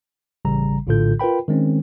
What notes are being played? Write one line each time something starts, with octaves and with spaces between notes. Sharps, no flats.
A1 C#3 G3 A#5
A#1 A2 D3 F4 A4 G6
F4 A#4 B4 G5 B5
D#3 G#3 C4 C#4